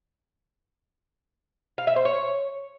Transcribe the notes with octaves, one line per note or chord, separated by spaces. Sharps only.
F5
E5
C5
C#5